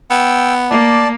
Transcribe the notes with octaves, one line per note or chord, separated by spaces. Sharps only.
B3 G5 E6
A#3 D5 A5